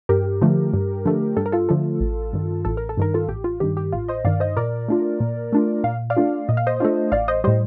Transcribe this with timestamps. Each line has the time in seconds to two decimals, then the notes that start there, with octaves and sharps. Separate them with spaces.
0.09 G2 G4 A#4
0.42 D3 F3 A3
0.73 G2
1.06 D3 F3 A3
1.37 G2 A4
1.46 A#4
1.52 F4 A4
1.69 D3 F3 A3
2.00 A1
2.33 G2 D#3
2.65 A1 A4
2.77 A#4
2.89 A4
2.97 G2 D#3 A#4
3.14 F4 A4
3.28 A1 G4
3.44 F4
3.60 G2 D#3 G4
3.77 G4
3.93 A1 F4
4.08 C5 D#5
4.25 G2 D#3 D5 F5
4.40 C5 D#5
4.57 A#2 A#4 D5
4.88 A3 D4 F4
5.20 A#2
5.53 A3 D4 F4
5.84 A#2 F5
6.10 D5 F5
6.17 A3 D4 F4
6.49 A#2 D#5
6.57 F5
6.67 C5 D#5
6.80 A3 D4 F4
7.12 A1 D5 F5
7.28 C5 D#5
7.44 A2 G3 C5 D#5